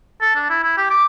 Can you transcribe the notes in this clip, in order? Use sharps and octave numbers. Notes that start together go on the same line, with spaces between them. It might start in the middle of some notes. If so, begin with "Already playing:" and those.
A4
D4
E4
E4
G4
D6